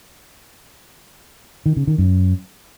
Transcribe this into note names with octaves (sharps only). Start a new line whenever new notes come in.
D#3
C#3
D#3
F#2